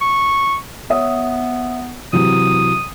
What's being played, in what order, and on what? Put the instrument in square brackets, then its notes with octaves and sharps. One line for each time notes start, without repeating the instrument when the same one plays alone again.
[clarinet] C#6
[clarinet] B3 [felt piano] C#5 E5 D#6
[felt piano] C3 E3 F#3 [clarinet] D#6